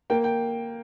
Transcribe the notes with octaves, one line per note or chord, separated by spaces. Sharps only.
A#3 G5
G5